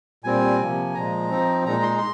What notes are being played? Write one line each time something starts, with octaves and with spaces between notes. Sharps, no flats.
A#2 G3 C4 G#5
C3 F3 A#3
A#2 F3 G#3 A#5
F3 C4 D#4
A#2 G#3 D#4 A#5
C6
A#5
C6